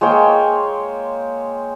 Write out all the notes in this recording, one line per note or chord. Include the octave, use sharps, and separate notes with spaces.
G#3 A#3 C#5 G5